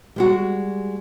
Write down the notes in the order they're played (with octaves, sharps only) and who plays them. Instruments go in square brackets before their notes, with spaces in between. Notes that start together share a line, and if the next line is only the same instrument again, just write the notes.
[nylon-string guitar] G3 G#3 F#4